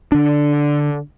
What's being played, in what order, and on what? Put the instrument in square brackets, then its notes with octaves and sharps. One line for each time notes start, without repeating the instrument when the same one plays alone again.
[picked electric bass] D3 D4